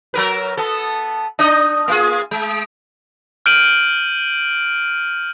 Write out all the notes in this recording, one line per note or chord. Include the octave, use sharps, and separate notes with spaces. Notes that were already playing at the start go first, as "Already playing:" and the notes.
F#3 A#4 B4
B3 A4
D4 D#4 D#5
A#3 F4 G#4
G#3
F6 G6 D7 D#7 F#7